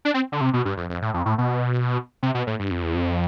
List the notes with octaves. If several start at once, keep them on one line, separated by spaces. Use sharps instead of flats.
D4
C4
D3
C3
B2
G2
F2
F2
A2
F2
A2
B2
C3
B2
A2
G2
F2
E2
F2